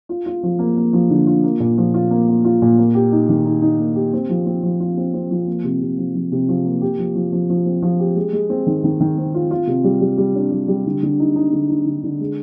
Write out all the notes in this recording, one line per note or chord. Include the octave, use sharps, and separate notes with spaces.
F4
F4
F3
A#3
A#3
F3
D3
F4
A#3
A#2
F3
F4
A#3
A#3
F4
A#2
A#3
G4
D#4
D#3
D#4
D#4
A#3
G4
C4
F3
C4
F3
F4
C4
C4
F3
A#3
C3
C3
F3
F3
C3
F3
A#3
G4
F3
F3
F3
F3
C4
F3
G4
G#3
G#3
C4
D#3
D#3
D#3
C4
F4
F4
C3
G3
G3
G3
D4
G3
G3
D3
D3
D#4
D#4
D3
D#4
D3
D3
G#3